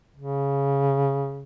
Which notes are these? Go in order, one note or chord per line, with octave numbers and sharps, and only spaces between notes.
C#3